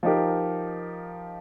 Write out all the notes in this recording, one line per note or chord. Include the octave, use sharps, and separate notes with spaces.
F3 D#4 G4 A#4